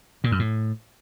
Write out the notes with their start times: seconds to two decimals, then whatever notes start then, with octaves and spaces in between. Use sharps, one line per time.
0.24 A#2
0.32 F#2
0.39 A2